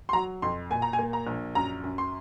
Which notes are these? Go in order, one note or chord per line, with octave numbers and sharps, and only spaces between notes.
C6
F#3 A#5
F2 C6
A#2 G#5
A#5
G#5
A#3
A#5
A#1
F#2 A#5
F#2
C6